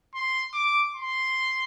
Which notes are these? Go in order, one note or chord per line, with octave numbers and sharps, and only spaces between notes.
C6
D6
C6